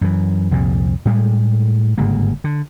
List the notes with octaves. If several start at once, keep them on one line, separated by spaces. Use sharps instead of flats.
F#2 E3
C2 F2 A#2
A2 G3 G#3
G1 G#2 C#3 A#3
D3